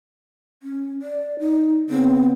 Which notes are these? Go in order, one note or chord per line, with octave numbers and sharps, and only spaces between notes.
C#4
D5
D#4
C#3 B3 C4